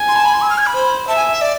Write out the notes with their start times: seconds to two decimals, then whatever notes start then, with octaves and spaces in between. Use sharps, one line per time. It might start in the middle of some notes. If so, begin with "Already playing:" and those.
Already playing: G#5
0.08 C6
0.16 A5
0.25 B5
0.33 C6
0.42 E6
0.50 F6
0.58 G#6
0.66 B5
0.74 C5
1.08 E5 A5
1.16 G#5
1.33 E5
1.41 D5